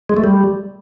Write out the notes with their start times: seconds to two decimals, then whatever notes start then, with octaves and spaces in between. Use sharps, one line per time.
0.09 G#3
0.17 A3
0.24 G3